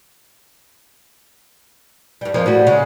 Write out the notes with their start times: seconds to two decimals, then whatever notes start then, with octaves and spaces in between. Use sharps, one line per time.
2.21 G2 G3
2.34 F2 F3 A#3
2.46 A2 G3 F#4
2.67 C#3 G#3